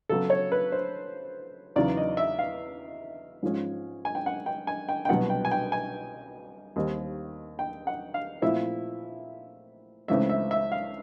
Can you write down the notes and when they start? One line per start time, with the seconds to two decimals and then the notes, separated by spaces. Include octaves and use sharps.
0.09 C#3 F#3 B3 A4
0.30 C#5
0.52 B4
0.72 C5
1.76 E2 C#3 F#3 B3 D#4 D5
1.97 D#5
2.17 E5
2.39 F5
3.43 G#2 F3 G#3 C#4
4.05 G#5
4.15 G5
4.26 F#5
4.46 G5
4.67 G#5
4.89 G5
5.05 G5
5.09 C2 B2 F#3 B3 F#5
5.30 G5
5.45 G#5
5.51 G5
5.72 G#5
6.76 D#2 D#3 G3 C4
7.59 G5
7.87 F#5
8.14 F5
8.42 A#2 F3 A3 C4 E4 E5
10.08 C#2 C#3 E3 A3 C4 E5
10.29 E5
10.51 E5
10.72 F5